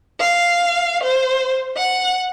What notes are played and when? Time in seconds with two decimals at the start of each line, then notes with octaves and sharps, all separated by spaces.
0.20 F5
1.02 C5
1.76 F#5